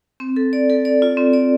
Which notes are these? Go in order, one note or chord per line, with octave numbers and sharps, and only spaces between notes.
C4
A4
D5
A4
D5
F4
C4
D5